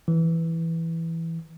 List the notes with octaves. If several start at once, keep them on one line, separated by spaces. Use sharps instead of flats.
E3